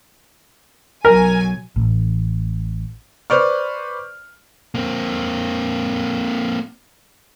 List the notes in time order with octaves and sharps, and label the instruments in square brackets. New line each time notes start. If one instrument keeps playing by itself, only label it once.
[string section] B1 F#3 G#5 [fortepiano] A#4
[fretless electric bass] A1
[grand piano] B4 C5 D5 C#6 F6
[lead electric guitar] A#3 C4